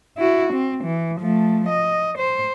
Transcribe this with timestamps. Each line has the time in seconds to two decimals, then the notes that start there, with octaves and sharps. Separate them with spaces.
0.18 E4 F#4
0.53 C4
0.85 E3
1.21 F3 A3
1.69 D#5
2.18 C5